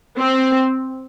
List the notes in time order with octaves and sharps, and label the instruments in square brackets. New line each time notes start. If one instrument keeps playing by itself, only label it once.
[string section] C4